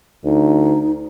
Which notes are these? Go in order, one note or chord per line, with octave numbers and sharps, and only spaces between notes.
D2 D#4